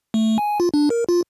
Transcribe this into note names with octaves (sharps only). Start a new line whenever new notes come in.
A3
G#5
F4
D4
A#4
F4